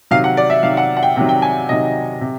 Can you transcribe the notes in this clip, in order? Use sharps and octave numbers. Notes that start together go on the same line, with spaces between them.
C3 D#3 F#3 F5
F#5
D5
E5
C3 D#3 F#3 F5
F#5
F#5
G5
C3 D#3 F#3 G5
G5
G#5
C3 D#3 F#3 D#5
C3